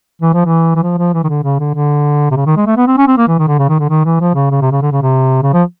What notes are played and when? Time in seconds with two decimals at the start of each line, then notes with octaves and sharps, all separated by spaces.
0.22 E3
0.34 F3
0.46 E3
0.75 E3
0.83 F3
0.98 F3
1.14 E3
1.24 D#3
1.29 D3
1.44 C#3
1.60 D3
1.75 D3
2.31 C3
2.37 C#3
2.46 D#3
2.57 G#3
2.67 A3
2.77 B3
2.87 C4
2.97 C#4
3.08 C4
3.18 A#3
3.28 E3
3.39 D#3
3.48 D3
3.59 C#3
3.69 D#3
3.79 D3
3.89 D#3
4.05 E3
4.20 F3
4.35 C#3
4.51 C#3
4.61 C3
4.72 C#3
4.82 D3
4.92 C#3
5.02 C3
5.43 C#3
5.53 F3